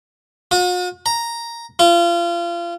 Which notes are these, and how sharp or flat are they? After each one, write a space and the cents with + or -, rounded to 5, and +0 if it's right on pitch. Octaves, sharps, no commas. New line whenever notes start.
F#4 -45
A#5 +0
F4 -30